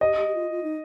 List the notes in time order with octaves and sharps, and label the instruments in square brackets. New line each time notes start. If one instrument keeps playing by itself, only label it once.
[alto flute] G4 [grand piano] D#5
[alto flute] G4
G4
F4
F4
D#4